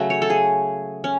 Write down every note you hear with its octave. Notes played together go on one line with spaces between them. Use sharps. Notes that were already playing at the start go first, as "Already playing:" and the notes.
Already playing: C#3 F#3 A3
C#5
A4
G#4
C#4